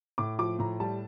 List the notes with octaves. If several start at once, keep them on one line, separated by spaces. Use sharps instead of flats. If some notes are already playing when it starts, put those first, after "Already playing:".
A2 D6
F3 D6
A2 A#5
G3 A5